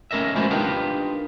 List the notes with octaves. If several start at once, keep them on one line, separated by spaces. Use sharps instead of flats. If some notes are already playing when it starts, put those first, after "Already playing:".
A3 C#4 A#4 D#5 E5
G#3 B3 C#4 E4 F#4 C5
D4 D#4 F4 G4 A#4 B4